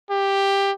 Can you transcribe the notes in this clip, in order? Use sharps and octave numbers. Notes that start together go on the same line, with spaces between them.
G4